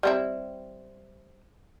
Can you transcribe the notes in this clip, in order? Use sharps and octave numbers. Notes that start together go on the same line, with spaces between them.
G3 C4 E4